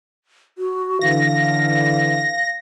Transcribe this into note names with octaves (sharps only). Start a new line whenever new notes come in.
F#4
D3 E3 F5 A#6